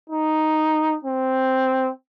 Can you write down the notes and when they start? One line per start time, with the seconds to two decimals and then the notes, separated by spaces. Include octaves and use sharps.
0.10 D#4
1.05 C4